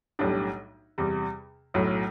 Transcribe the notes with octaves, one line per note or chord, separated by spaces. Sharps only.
B1 A2 G3 D4 G4
E2 C3 G3
B1 A2 F#3